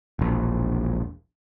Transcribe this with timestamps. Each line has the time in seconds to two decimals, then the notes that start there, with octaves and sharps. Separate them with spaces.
0.19 E1 A#1